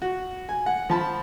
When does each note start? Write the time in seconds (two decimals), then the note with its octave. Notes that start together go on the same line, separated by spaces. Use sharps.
0.02 F#4
0.49 G#5
0.66 F#5
0.89 F3 A5 B5